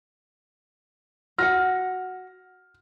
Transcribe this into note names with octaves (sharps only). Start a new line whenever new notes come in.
F#4 F#5 F6 A#6